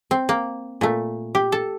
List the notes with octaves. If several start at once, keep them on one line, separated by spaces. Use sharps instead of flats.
C4
A#3
A#2 A3
G4
A4